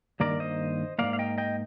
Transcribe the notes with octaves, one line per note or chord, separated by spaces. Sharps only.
G2 D#3 A#3 A#4 D5
C5 D#5
G#2 F3 A#3 D5 F5
F5
D#5 G5
D#5 G5